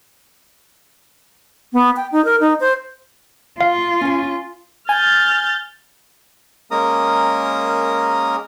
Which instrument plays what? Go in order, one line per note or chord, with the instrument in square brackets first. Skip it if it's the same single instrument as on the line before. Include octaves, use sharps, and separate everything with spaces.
[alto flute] B3
G5
D#4
A#4
D#4
C5
[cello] F4 [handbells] F5
[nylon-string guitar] C#4 G#5
[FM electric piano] G#5 [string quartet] F6 G6 A6
[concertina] G#3 A#3 C#4 A#4 A#5 D#6